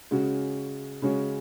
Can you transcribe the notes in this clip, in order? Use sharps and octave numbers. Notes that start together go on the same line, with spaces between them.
C#3 G#3 C#4 F#4
C#3 G#3 C#4 F#4